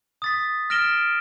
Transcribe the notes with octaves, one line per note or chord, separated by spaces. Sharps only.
D#6 A6 B6
F6 A#6 D7 E7 G7